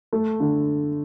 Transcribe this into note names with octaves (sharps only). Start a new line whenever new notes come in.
A3
D3